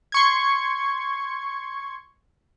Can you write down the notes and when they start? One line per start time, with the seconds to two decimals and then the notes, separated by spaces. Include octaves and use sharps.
0.12 C6 C#6 G#6